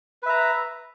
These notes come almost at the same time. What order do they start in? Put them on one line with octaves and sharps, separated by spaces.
B4 E5 A#5